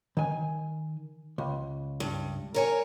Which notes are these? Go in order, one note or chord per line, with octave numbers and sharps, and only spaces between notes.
D#3 G#5
C#2
G2
A#4 C#5 G#5